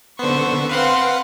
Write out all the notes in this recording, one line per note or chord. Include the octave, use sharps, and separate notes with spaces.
D3 B3 C5 C#6
C4 B4 F5 F#5 C6